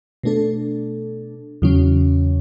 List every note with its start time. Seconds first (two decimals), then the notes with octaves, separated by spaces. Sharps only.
0.23 B2 A3 D4 A4
1.62 E2 C#3 F#3 C#4